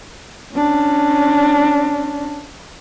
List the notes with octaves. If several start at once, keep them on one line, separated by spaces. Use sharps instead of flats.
C#4 D4